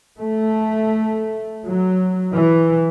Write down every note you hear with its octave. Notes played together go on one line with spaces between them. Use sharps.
A3
F#3
E3